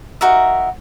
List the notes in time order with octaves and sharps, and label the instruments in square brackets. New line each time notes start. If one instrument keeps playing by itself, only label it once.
[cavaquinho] D#4 F#4 A#4 E5